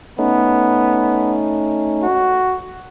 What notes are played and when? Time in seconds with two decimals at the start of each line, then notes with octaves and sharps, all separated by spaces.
0.18 A3 B3 C#4 D#4
2.03 F#4